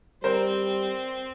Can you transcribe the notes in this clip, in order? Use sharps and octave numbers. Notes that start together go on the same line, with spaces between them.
G3 C4 A#4 C5